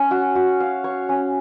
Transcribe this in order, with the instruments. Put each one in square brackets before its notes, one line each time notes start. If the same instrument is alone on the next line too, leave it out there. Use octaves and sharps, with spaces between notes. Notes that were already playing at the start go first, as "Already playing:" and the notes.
Already playing: [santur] C#4
F#4
F#4
F5
C#5
C#4